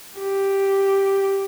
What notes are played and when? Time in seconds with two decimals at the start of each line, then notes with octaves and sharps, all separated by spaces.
0.19 G4